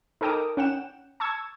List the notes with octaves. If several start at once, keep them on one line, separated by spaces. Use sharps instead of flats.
D#4 A4 A#4 G5 D6 D#6
C#4 F#5 G5 E7
A5 C#6 E6 G#6